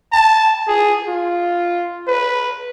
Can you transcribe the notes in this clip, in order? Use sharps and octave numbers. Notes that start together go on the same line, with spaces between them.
A5
G#4
F4
B4